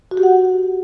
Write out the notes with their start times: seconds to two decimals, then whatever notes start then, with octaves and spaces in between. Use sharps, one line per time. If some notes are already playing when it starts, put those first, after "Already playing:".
0.11 F#4
0.17 G4
0.23 F#5